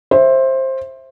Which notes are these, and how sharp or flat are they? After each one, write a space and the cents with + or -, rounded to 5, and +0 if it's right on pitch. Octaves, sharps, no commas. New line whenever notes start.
C5 +15 E5 +0